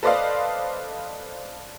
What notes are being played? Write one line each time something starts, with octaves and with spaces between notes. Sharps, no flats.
A4 B4 C5 D5 D#5 F5